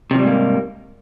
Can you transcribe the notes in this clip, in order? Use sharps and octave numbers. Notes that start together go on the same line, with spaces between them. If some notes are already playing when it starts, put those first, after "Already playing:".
G#2 C3 F3 G3 A#3